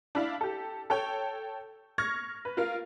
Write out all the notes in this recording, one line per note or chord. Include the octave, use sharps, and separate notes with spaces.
D4 E4 F5
G4 A4
A4 C#5 G5
C#6 F6 G#6 A#6
B4
F4 A#4 F5